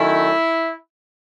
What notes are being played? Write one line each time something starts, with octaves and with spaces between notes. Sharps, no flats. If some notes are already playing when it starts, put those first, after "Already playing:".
Already playing: D#3 F#3 A3 C#4 E4